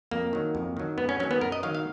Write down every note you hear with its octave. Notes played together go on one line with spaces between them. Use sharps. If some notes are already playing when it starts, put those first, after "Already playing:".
F2 A#3
D#3 F#3
F2
D#3 F#3
F#2 B3
C#4
D#3 F#3 C#4
B3
F#2 A#4
D#5
D#3 F#3 F5
F5